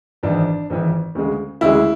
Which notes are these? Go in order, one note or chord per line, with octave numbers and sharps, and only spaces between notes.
G#1 G#2 E3 D4
G#1 G#2 E3
D2 C#3 G#3
D2 C#3 G#3 E4